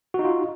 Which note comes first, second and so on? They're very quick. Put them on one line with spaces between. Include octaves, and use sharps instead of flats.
F#4 D#4 F4